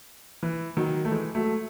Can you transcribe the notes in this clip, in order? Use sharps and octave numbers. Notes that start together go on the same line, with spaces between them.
E3
D#3 F#3
A3
E3 G#3
F#3 A3